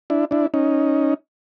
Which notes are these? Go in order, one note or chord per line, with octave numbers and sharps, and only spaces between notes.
D4 E4
D4 E4
C#4 D#4